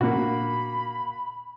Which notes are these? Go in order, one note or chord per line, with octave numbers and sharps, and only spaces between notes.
A#2 A#3 D4 F#4 B5